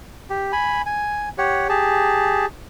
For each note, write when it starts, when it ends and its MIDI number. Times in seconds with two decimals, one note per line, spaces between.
0.30 0.52 67
0.52 0.82 80
0.52 0.82 83
0.86 1.29 80
1.38 1.68 67
1.38 1.68 73
1.38 1.68 78
1.69 2.46 67
1.69 2.46 68
1.69 2.46 81